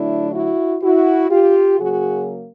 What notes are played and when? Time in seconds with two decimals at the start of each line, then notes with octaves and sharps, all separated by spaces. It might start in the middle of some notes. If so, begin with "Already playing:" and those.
Already playing: D3 F#3 A3 D4 E4
0.33 E4 F#4
0.82 E4 F#4
1.30 F4 G4
1.79 C#3 F#3 A#3 F#4 G#4